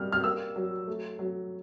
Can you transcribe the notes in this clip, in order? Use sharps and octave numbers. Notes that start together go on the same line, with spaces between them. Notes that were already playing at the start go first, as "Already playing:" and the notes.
Already playing: G3 A#3 F6
F6
A#3 E6
F#3
A3
F#3